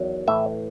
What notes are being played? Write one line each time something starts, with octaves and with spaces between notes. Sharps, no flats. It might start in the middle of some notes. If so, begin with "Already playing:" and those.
Already playing: E2 D#3 F#3
A2 E3 E5